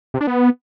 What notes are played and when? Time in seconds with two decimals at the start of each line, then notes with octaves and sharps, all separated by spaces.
0.14 C3
0.21 D4
0.27 B3